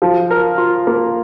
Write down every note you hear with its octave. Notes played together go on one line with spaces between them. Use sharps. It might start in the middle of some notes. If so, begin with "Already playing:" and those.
F3
A#4
F4
A#3